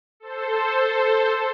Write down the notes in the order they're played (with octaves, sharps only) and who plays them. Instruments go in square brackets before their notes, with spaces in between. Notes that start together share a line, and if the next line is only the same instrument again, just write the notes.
[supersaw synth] A4 C5